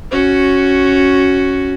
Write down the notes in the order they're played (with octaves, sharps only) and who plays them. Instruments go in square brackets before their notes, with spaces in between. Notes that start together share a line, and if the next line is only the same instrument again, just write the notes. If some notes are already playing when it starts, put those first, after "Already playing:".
[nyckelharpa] C#4 F#4